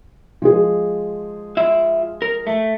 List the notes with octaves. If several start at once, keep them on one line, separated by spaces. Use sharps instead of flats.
F3 G#3 G#4
F4 E5
A#4
A3